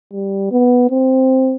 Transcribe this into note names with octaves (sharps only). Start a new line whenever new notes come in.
G3
B3
C4